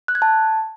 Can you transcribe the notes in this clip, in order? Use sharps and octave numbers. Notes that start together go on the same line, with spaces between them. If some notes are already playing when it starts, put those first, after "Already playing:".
F#6
G#6
A5